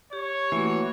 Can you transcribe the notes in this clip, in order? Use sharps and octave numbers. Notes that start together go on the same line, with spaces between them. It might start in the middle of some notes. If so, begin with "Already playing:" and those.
G4 C#5
E3 A3 A#3 F#4